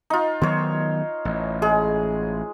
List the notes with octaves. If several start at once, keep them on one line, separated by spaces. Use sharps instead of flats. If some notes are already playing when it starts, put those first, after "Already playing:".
D#4 F4
D#3 F#3 B3 C5 C#5
A1
G#3 G#4